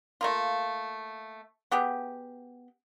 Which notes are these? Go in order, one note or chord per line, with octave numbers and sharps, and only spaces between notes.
A3 A#3 F4
B3 G4 G#4